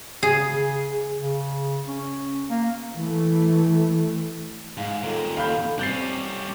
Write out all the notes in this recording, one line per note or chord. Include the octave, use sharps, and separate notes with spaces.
C#3 G#4
C#3
C#4
A#3
E3 A3
G#2 F5
D#2 A#2 A4
F5 B5 G6
G3 C4 C#4 G6 A6 C7